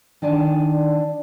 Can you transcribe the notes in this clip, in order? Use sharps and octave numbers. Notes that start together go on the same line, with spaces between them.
D#3 D4 D5 G#5 A5